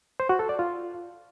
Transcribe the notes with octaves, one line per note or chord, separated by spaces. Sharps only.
C5
F#4
A4
D5
F4